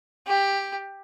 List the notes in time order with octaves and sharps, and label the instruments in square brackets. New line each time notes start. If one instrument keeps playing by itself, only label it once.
[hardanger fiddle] G4